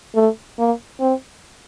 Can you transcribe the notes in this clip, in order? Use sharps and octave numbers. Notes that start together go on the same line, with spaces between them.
A3
A#3
C4